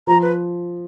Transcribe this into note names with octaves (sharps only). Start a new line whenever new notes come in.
F3 A#5
B4